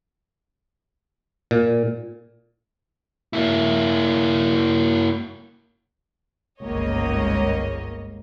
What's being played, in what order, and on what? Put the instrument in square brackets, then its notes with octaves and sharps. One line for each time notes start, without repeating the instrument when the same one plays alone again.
[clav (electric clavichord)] A#2
[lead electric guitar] A#3 E4
[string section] G1 C#2 G#2 A#3 C#5 D#5